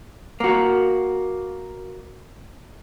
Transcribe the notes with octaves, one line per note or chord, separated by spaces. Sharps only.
A#3 F#4